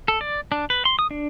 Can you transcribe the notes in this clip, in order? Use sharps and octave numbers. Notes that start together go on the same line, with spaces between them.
A4
D5
D4
B4
C6
D#6
D4